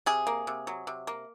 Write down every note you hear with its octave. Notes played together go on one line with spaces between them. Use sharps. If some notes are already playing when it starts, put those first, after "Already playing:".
C3 G#4
A#3
C3
F#3
C3
A#3